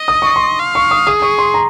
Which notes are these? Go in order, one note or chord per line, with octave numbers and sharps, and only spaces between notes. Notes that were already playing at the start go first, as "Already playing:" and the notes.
Already playing: D#5
D#6
C#6
C6
F5
C#6
D#6
G#4 D#6
C#6
C6
A#5